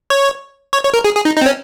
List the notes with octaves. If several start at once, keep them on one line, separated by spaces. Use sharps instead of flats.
C#5
C#5
C#5
A#4
G#4
G#4
D#4
D#4
C4
C#4